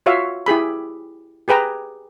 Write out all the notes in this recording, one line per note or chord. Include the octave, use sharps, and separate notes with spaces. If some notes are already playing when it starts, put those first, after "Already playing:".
F4 F#4 C#5 E5 F5
E4 G4 G#4 B5
G4 G#4 B4 G5 A#5